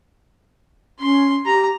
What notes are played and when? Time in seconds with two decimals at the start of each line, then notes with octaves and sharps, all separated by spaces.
1.00 C#4 C6
1.46 G4 A#5